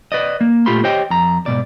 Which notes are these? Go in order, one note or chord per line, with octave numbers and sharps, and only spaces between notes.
B4 D5 D#5
A#3
A#2 A3 F4 G4 B5 C6
G4 C5 C#5 D#5 G5
F2 A#5
G#2 B2 D5